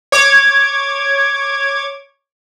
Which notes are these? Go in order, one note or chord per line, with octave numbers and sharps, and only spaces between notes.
C#5 D6 G#6